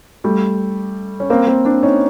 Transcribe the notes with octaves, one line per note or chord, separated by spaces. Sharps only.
G3 A3
C#4
A#3 C4
A#3 C4
C4 D4
C#4 D#4